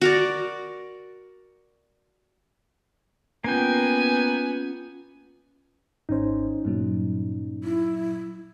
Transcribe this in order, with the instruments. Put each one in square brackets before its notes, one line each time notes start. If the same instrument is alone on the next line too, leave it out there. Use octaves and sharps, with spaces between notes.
[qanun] F#4 A#4 D5
[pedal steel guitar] A#3 G5 [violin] B3 G#5 [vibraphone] C#4 F4
[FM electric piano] G#1 C5 [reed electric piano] C#4 D#4
[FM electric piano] G2 A#2 F#3
[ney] E4